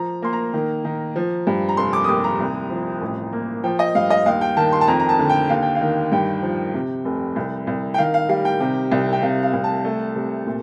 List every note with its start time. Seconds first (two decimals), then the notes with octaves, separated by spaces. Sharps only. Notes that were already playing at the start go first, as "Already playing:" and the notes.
Already playing: F3 A#5
0.22 A#3 C6
0.33 A#5
0.53 D#3
0.85 D#3
1.16 F3
1.47 G2
1.69 A#5
1.77 F1 C6
1.93 D6
2.04 D#6
2.08 D#2 D6
2.24 A#5
2.40 C2
2.70 F3
3.01 A1
3.32 A#3
3.64 F3 G5
3.79 D#5
3.95 G2 F5
4.10 D#5
4.26 D#2 F5
4.41 G5
4.57 D#3 A5
4.73 C6
4.81 A5
4.88 F2 A#5
5.00 A#5
5.09 A5
5.19 D3
5.29 G5
5.50 D#2 F5
5.63 G5
5.75 F5
5.81 D#3
6.12 G2 G5
6.43 F3
6.74 C3
7.05 F1
7.36 C2
7.67 C2
7.94 G5
7.98 D#3 F5
8.14 F5
8.29 G3 F5
8.45 G5
8.60 C3
8.92 C2
9.12 G5
9.22 C3 F5
9.43 F5
9.53 C2
9.64 A5
9.85 A3
10.16 C3
10.46 A#2